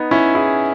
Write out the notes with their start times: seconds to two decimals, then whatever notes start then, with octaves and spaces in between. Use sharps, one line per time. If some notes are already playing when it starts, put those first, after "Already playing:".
Already playing: B3 D#4
0.11 C#4 E4
0.35 E4 G#4